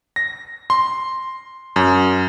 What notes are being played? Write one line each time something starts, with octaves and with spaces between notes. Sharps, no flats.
A#6
C6
F#2